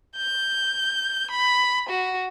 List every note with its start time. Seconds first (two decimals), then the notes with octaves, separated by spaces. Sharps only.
0.16 G6
1.31 B5
1.89 F#4